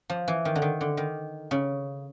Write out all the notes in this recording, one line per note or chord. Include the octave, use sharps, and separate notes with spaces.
F3
E3
D#3
D3
D#3
D3
D#3
C#3